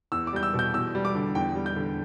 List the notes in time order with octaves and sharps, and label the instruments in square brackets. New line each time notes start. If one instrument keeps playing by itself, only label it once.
[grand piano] E2 E6
D6
G3 G6
E6
B2
G6
E2 E6
G3
D6
D3
E2 G5
G3
G6
D3